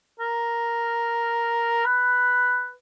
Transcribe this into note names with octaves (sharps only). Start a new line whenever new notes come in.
A#4
B4